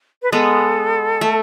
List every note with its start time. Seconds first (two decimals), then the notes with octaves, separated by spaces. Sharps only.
0.23 B4
0.32 G#3 B3 A4
1.21 A3